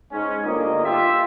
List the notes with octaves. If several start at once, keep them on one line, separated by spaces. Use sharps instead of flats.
G#2 C#4
G1 A#3 F4 D#5
F4 G4 E5